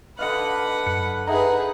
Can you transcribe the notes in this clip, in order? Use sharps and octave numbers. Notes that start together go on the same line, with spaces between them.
D3 B4 D#5 F5 F#5
F#2 F#6 C#7
D#4 G#4 B4 E5 F#5 A#5